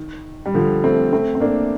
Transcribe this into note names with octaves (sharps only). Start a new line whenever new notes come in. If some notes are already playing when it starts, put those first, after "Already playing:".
Already playing: D#3
G3
D3 F3
A3 C4
A3 C4
C4
A#3 D4